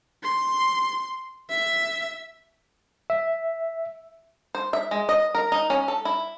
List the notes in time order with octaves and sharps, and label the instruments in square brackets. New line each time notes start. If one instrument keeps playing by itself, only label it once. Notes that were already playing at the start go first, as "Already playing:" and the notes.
[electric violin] C6
E5
[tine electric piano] E5
[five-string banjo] C5
E5
G#3
D#5
A#4
D#4
C#4
A4
E4